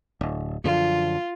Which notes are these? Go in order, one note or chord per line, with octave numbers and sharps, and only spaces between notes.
D1
F#2 D3 F3 F4